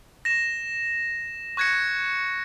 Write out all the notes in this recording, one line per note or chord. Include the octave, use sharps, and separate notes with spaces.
A#6 E7
C#6 F#6 G#6 A#6 C#7